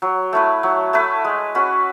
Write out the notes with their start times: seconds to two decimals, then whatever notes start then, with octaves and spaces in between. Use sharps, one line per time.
0.02 F#3
0.33 A3 E4 B4
0.63 F#3
0.93 A3 E4 B4
1.24 G#3
1.55 C#4 F#4 B4